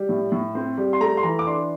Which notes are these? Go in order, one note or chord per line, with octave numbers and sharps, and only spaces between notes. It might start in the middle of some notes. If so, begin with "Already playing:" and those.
Already playing: G3
A2
A2
C4
G3
C6
A3 A#5
C6
E3 A#5
D6
D4 C6